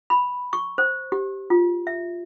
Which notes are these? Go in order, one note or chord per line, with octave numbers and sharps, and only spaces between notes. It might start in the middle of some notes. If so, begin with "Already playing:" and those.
B5
C#6
C5
G4
F4
E5